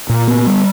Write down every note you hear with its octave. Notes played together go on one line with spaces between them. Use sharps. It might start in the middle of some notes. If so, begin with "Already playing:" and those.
A#2
B3
G3